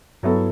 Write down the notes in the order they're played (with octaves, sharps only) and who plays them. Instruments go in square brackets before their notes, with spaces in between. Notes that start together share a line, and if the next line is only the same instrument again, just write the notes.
[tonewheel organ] G2 [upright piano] F#3 B3 E4 A4